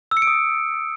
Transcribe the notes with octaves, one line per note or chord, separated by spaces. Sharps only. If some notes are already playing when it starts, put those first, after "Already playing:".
E6
C#7
D7
D#6